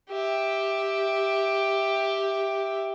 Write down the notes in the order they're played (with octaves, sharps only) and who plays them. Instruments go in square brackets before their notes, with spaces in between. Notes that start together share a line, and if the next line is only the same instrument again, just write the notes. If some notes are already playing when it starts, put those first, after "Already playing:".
[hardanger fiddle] G4 E5